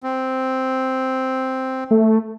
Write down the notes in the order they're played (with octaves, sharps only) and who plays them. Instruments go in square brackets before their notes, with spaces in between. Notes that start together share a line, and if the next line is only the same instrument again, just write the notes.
[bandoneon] C4
[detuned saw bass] A3